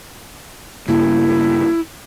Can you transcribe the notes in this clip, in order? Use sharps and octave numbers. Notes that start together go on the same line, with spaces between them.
G2 C#3 A#3 E4